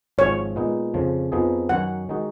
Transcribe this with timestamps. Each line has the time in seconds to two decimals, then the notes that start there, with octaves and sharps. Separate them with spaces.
0.18 G#1 G#2 F3 C#5
0.56 A#2 G#3 B3 D#4
0.94 F2 C#3 F3
1.32 F2 F3 B3 D#4 G#4
1.69 F#2 D#3 F#3 C#4 F#5
2.09 D#3 G#3 D#4 F#4